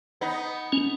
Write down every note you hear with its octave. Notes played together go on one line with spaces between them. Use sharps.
B3 D#4
C#4